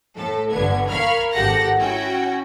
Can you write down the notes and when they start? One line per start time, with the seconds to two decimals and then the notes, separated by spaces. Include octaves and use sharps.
0.15 A2 A4
0.50 G1 D3 B3 G#6
0.89 A#4 F5 B5 C#6 F6 G#6
1.33 G#1 G4 A4 F#5 A#6
1.78 C#4 E4 F#4 G5